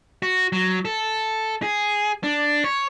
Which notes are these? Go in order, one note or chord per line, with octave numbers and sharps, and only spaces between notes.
F#4
F#3
A4
G#4
D4
C#5